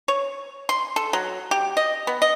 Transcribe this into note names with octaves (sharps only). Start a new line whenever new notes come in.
C#5
C6
A4
F#3
G4
D#5
B3
D#5